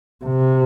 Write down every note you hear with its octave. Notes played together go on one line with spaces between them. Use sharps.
C3